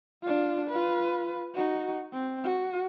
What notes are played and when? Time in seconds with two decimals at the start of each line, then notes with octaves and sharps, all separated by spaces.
0.23 D4 F4
0.69 F4 B4
1.55 D#4 F#4
2.13 C4
2.44 F#4